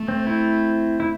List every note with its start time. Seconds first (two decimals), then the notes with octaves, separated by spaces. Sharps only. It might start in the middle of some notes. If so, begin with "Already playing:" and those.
Already playing: A3
0.08 C4
0.26 C4 E4
1.00 E4